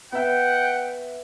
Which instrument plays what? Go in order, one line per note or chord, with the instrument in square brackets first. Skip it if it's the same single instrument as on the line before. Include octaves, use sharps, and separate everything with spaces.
[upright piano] B3 E5 [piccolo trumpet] F#5 [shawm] G5